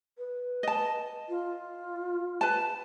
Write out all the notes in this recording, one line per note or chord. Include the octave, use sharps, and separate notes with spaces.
B4
D#5 A5
F4
B4 A5